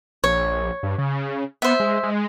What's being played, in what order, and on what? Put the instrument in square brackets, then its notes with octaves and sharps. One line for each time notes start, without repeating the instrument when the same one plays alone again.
[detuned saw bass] A#1 [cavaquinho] C#5
[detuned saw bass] G2
C#3
[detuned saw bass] B3 [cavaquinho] C5 E5
[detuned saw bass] G#3
G#3